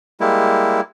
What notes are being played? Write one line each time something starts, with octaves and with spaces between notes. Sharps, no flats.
G3 G#3 A#3 E4